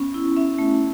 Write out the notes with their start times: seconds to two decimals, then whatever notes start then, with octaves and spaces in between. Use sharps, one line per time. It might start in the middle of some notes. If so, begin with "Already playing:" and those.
Already playing: B3 C#4 C#6
0.14 E4
0.37 C#4 E5
0.58 A3